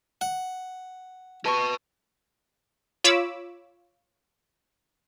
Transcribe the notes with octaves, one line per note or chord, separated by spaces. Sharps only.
F#5
B4 D#5 A5 C#6
F4 C#5 B5 D6 E6